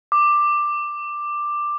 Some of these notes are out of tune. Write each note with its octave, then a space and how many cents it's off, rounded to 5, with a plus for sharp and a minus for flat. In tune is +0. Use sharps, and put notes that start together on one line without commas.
D6 +10